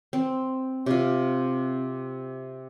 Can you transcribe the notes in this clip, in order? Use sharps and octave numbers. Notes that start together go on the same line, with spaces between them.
C4
C3 F4